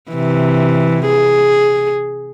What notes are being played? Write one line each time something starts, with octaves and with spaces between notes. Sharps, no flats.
C3 E3
G#4